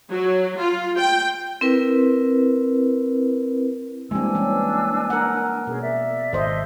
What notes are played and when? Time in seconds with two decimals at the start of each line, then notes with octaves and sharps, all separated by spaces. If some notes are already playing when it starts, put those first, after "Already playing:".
0.12 F#3
0.58 F4
0.98 G5
1.61 C4 E4 A#4 B4
4.11 E3 G3 G#3 A#3 C4 D4 G#5 E6
4.35 E3 C#4
5.10 A#4 F#5
5.67 B2 C#4 G#4 A#4
5.81 D5 E5
6.33 G#1 A4 C5 D#5